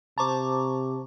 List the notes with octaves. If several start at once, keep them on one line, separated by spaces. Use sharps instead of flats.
C3 C5 A5 A#5 C#6 D6